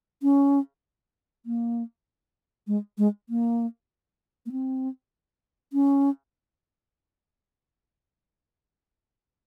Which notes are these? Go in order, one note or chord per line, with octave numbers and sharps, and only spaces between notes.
C#4
A#3
G#3
G#3
A#3
A#3
C4
C#4